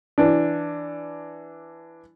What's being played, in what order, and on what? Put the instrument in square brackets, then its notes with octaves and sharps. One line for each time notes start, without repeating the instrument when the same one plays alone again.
[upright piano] E3 D4